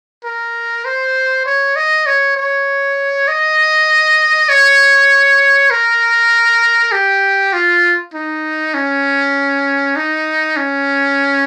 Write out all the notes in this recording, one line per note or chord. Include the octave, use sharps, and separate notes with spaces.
A#4
C5
C#5
D#5
C#5
C#5
D#5
C#5
A#4
G4
F4
D#4
C#4
D#4
C#4